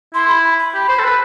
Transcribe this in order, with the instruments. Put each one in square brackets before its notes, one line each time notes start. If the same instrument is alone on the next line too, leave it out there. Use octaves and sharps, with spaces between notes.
[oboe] E4 [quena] C6
[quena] B5
B5
B5
[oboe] G4
C5
A4
B4